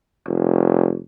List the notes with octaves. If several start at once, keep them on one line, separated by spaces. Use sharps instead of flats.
F1